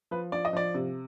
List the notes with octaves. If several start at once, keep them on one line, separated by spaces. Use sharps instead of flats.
F3 B4
F3 D5
D#5
F3 D5
C3